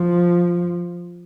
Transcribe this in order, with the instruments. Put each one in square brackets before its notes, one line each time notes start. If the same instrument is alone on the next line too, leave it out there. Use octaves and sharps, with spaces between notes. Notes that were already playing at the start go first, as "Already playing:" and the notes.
Already playing: [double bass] F3